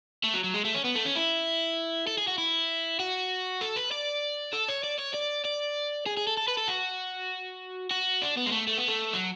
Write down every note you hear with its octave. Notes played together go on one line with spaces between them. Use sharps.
A3
F#3
F#3
G#3
A3
C#4
B3
A3
C#4
E4
A4
G#4
F#4
E4
F#4
A4
B4
D5
A4
C#5
D5
C#5
D5
D5
G#4
G#4
A4
A4
B4
A4
F#4
F#4
D4
B3
G#3
A3
A3
B3
A3
F#3